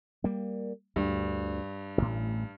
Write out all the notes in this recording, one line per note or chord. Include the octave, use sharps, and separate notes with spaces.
G3 A#3
D2 G2
A1 A2